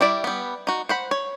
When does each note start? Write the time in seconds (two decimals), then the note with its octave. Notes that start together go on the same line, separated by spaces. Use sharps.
0.01 G3 E4 D5
0.24 G3 B3
0.67 D#4 F#4
0.89 C5 F#5 B5
1.11 C#5